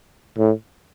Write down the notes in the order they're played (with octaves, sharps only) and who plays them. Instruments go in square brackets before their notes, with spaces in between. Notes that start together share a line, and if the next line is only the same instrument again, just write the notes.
[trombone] A2